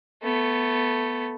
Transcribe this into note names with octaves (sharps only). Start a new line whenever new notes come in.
A3 B3